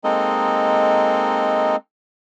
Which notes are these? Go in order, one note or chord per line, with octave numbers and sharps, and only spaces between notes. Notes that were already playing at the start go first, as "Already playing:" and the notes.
G#3 A#3 C4 D#4 A4 D#5